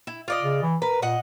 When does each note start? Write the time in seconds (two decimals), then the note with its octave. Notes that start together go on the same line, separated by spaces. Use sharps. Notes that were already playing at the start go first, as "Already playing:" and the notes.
0.07 E4
0.28 F4 D5 D#5
0.43 C#3
0.62 E3
0.82 A#4 B4
1.02 A#2 D#5 F#5